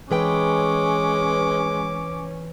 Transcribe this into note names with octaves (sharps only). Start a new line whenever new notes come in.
E3 G#3 C#4 B4 G5 D6